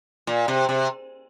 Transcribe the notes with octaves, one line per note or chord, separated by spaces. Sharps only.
A#2
C3
C3